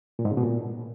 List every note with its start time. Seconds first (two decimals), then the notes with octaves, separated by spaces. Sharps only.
0.19 A#2
0.25 G#2
0.31 C#3
0.37 B2
0.43 A#2